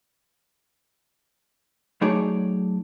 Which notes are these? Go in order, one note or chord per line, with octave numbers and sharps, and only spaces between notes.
F#3 A3 D#4 G#4 C#5 D5